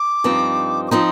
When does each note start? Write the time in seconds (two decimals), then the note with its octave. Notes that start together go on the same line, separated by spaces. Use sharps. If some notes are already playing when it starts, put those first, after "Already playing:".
Already playing: D6
0.24 G2 F3 C4 D#4
0.88 D6
0.91 F3 C4 D#4 C6